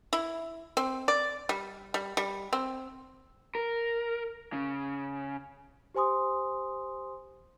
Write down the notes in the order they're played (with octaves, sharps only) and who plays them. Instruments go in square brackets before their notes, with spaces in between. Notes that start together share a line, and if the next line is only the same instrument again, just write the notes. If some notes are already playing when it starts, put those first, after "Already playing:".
[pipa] E4
C4
D5
G3
G3
G3
C4
[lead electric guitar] A#4
C#3
[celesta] G4 C5 G#5 C6 D#6